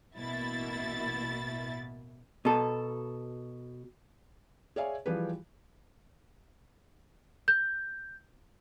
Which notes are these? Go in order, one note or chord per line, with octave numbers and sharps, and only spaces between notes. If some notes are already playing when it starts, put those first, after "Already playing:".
A1 B2 A#3 E4 A6
B2 A4
G#4 C#5 D5 E5 F5 G#5
E3 F3 G3 G4 G#4 B4
G6